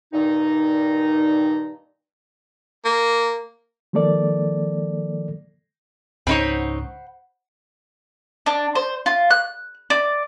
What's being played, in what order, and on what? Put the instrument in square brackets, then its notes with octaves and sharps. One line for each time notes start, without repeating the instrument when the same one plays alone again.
[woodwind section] G2 A#2 D#3 D#4
[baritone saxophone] A#3
[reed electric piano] D#3 F3 G#3 A#3 A4 D5
[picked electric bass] C#2 G#2 [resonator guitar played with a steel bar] C4 D#4 C#5 [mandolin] C5 F#5 B5
[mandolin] D4
C5
F4
F#6
D5